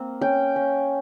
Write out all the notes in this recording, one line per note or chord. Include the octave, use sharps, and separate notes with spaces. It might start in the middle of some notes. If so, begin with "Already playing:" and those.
Already playing: A#3 C4
C#4 G5
C#4